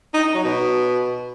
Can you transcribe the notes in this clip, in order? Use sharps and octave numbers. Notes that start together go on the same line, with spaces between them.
D#4
D#4
F#3
B2